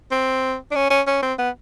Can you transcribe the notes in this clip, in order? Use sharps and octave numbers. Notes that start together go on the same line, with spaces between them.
C4
D4
C#4
C#4
C#4
C4
B3